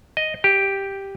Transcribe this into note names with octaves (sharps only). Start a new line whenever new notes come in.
D#5
G4